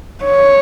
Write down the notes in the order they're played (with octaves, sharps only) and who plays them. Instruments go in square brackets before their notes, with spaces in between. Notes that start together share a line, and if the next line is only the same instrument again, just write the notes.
[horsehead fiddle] C#5